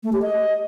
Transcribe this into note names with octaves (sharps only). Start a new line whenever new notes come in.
A3
G4
D#5